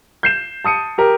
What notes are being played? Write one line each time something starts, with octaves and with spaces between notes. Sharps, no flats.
G6 C7 E7
A5 D#6 C#7 D#7
G4 A#4